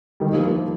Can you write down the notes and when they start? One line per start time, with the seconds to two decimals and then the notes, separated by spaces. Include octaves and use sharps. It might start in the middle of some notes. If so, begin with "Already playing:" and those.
0.20 D#3 G3
0.33 F3 A#3
0.47 F3 A#3